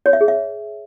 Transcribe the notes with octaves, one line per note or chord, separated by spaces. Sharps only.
C#5
E5
G#4
E5